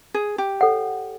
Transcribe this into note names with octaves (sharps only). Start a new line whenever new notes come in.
G#4
G4
A4 C#5 F#5